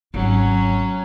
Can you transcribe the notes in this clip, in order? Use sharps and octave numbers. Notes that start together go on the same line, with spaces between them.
G#1 F#3 C#4